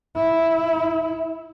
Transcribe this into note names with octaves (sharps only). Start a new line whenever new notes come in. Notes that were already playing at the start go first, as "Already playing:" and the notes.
E4